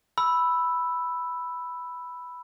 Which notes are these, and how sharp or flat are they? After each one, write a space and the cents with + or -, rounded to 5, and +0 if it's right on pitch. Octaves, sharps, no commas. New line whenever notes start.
B5 +0 E6 +0